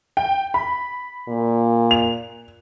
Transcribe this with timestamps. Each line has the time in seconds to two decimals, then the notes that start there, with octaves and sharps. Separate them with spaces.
0.17 G5
0.54 B5
1.28 A#2
1.91 F7